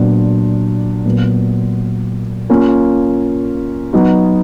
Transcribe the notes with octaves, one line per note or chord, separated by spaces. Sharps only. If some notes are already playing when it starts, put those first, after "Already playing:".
Already playing: A#2 F#3 B3 D4
A#2 F#3 B3
A#3 C#4 F4
F#3 B3 D#4 F#4